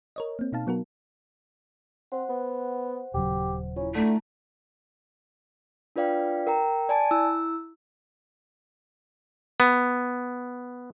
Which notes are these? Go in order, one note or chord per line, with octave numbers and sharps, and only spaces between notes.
A#4 C#5 D#5
A#3 C4
B2 D#4 F5 A5
F#3 B3 F#4 A#4
C4 C5 F#5
B3
D#1 C#3 F#3 G4
C#4 E4 F4
D3 A3 A5 A#5
D4 F4 B4 D5 F5 G5
A#4 G5 A#5
D5 G#5 A5
E4 E6
B3